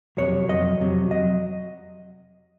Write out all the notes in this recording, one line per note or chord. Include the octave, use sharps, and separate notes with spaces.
F2 C3 F#3 C#5
F2 C3 F#3 D#5
F2 C3 F#3
F#3 D#5